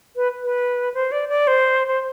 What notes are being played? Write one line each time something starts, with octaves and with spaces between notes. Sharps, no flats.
B4
B4
C5
D5
D5
C5
C5